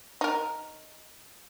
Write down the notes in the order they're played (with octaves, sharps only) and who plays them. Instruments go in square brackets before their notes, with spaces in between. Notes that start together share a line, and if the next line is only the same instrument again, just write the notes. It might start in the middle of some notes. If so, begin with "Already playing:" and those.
[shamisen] D#4 A#4